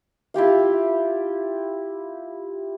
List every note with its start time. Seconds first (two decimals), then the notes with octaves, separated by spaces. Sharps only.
0.34 E4 F4 G4 F5